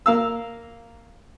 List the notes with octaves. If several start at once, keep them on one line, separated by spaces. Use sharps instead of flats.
A#3 F5 E6